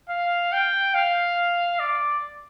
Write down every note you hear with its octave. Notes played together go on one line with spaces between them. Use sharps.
F5
G5
F5
D5